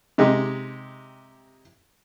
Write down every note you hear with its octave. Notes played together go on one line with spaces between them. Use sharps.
C3 G#3 D#4 G4 D#5